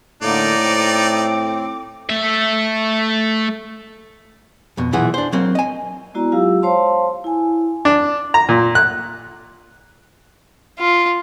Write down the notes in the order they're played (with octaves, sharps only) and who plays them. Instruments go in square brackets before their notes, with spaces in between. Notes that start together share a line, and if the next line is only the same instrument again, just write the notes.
[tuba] A2 [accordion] D3 A#3 [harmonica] D#4 D5 [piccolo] D6
[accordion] C4
[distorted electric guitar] A3 E5
[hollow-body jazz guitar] F2 B2
B1 A#2 E3 G#4 F#5
D4 C5
F#3 A#3 C4
D#5 G#5
[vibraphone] G#3 B3 E4 F#4 D5 A#5
F#3 G#3 F4 G4 F5 E6
C5 C#5 F5 A5 C6
E4 G#5
[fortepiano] D4
A#5
A#2
F#6
[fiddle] F4